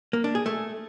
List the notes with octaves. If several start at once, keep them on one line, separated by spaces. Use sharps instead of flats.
A#3
D4
G#4
A3